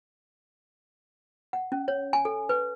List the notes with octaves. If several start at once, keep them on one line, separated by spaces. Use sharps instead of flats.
F#5
C#4
C#5
G#5
A4
B4